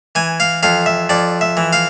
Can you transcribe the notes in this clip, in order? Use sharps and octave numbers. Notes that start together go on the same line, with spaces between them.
E3 G#5
F5
F2 F5
E5
F2 D5
E5
E3
F5